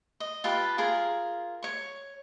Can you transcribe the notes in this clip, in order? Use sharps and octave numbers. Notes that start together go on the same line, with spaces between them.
D#5
F4 G4 B4 A5
F4 G#4 A#4 A#5
C#5 C#6